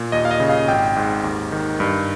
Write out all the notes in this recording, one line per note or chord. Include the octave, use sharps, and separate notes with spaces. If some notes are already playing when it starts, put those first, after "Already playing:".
Already playing: A#2
D#2 D#5
F5
D#5
C#3
F5
G#1 G5
G#2
D#2
D#3
G2